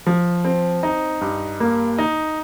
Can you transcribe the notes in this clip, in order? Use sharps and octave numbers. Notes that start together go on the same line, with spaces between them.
F3
C4
D#4
G2
A#3
D#4